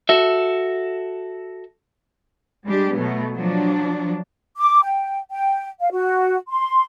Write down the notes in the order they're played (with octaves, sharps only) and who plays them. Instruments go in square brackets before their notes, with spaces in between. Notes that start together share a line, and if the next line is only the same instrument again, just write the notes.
[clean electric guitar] F#4 A4 E5
[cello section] G3 G#3 D4 G4
B2 F#3 A3 B3
F3 F#3 D4
[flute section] D6
G5
G5
F5
F#4
C6